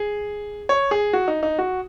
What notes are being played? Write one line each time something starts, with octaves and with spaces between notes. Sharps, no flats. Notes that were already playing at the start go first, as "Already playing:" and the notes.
Already playing: G#4
C#5
G#4
F#4
D#4
D#4
F#4